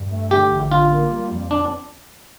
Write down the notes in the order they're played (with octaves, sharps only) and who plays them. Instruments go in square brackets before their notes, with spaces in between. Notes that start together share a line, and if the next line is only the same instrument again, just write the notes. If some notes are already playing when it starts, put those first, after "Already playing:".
Already playing: [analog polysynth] G2
A3
[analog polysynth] D3 [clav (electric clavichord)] G4
[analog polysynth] A1
[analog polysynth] D3 [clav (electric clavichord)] F4
[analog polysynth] A#3
G3
F2
[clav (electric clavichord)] D4